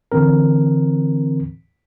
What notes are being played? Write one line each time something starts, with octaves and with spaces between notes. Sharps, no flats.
D3 E3 C4 A#4